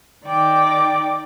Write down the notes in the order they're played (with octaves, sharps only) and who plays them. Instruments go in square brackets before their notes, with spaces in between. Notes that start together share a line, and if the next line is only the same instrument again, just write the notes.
[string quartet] D#3 D#4 D5 G5 D6